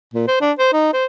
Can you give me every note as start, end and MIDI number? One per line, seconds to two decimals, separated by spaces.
0.14 0.27 46
0.28 0.41 72
0.41 0.52 62
0.59 0.71 72
0.73 0.90 63
0.93 1.06 72